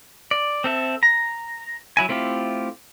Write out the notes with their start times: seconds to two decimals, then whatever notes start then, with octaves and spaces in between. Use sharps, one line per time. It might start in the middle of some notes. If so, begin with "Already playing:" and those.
0.31 D5
0.64 C4 A4 E5
1.03 A#5
1.97 F#3 E4 G#5
2.09 A3 C4 E4 F4 G4